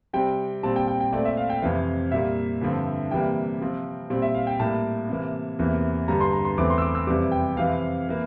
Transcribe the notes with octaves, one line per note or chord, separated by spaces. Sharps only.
C3 G3 C4 G5
A#2 G3 C4 A5
G5
G5
G5
A#2 A3 C4 D5
E5
F5
G5
F2 C3 E3 F5
A#2 G3 A#3 E5
G2 D3 F3 C4
C3 E3 G3 A#3 G5
C3 F3 C4
A#2 G3 C4
E5
F5
G5
A2 G3 A#3 A5
C3 E3 A#3
E2 C3 E3 A#3
G2 D3 G3 A#5
C6
A#5
C6
E2 E3 A3 C4 D6
C6
E6
D6
E6
F2 C3 E3 G3 D6
G5
F2 C3 E3 F5
E3 A#3